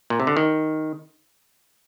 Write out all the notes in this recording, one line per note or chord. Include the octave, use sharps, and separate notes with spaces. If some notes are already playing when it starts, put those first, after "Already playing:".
A#2
C3
D3
D#3